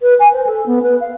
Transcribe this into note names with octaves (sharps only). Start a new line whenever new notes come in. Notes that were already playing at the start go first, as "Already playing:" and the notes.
B4
G#5
C5
A4
B3
B4
F5